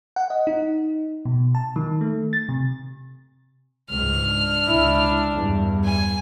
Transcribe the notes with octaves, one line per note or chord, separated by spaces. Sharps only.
F#5
D#5
D#4
B2
A5
D#3
A3
A6
C3
C#2 G#2 F6
D4
C#2 E4
E2 G2
G#5